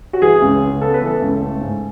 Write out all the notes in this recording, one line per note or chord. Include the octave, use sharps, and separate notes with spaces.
F#4
E3 G#4
C#2
C#3
B3 A4
B4
E3 A4
C#2
A3
G#2